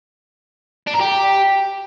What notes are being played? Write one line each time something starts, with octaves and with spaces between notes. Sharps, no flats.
D4
A#4
G4